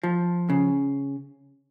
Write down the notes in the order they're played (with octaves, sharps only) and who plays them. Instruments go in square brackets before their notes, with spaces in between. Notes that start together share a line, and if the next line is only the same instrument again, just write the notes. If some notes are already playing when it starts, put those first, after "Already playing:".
[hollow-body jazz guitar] F3
C#3